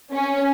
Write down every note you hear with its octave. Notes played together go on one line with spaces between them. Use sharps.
C#4